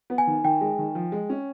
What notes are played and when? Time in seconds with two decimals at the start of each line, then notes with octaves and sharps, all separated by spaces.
0.10 B3
0.18 G#5
0.27 D#3
0.44 D#3 G5
0.61 G#3
0.78 D#3
0.95 F3
1.12 G#3
1.30 C#4